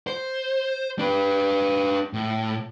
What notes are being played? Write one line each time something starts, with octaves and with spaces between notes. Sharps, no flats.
C5
D4 B4
A2